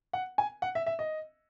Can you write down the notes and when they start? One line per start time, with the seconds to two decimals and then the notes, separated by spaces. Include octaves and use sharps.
0.13 F#5
0.38 G#5
0.62 F#5
0.75 E5
0.86 E5
0.99 D#5